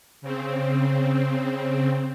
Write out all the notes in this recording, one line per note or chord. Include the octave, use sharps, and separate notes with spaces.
C#3 C4